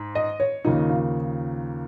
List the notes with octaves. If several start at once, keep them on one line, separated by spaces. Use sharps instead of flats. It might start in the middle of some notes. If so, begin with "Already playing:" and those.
Already playing: G#2
D#5
C#5
D#2 C#3 F3 A#3 D#4
F4